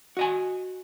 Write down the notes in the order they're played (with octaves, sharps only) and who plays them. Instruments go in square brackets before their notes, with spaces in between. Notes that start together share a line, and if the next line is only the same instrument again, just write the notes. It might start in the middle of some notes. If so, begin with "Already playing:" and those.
[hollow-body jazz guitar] F#4 D#5 G#5